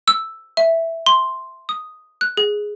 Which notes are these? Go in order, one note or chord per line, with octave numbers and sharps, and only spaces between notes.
E6
E5
C6
D#6
F#6
G#4